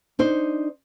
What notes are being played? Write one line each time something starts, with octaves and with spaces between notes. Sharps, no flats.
D4 D#4 C5